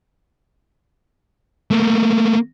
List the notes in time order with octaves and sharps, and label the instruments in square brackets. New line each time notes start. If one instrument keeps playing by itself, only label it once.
[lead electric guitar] A3 A#3